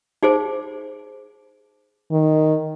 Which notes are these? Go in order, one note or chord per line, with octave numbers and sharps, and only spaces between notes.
D#4 G#4 C5
D#3